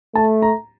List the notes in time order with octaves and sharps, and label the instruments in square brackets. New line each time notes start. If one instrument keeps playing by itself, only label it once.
[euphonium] A3 [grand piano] A5
[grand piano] A#5